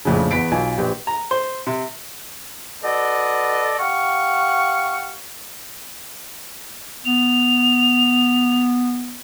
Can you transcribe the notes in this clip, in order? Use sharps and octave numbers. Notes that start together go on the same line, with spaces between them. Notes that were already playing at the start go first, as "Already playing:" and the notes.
A#1 F2 A2 C#3
E2 B3 B6 D7
B1 F4 G#5
A#1 G4 B4
A#5
C5
C3
F#4 A4 B4 D5 D#5
G4 F5 F#5 C#6
B3 F7